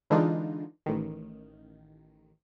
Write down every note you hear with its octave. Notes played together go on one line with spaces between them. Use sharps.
D3 E3 G#3 D4 D#4 F4
A1 D#3